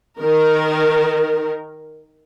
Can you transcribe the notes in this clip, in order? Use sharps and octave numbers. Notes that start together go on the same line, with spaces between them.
D#3 A#4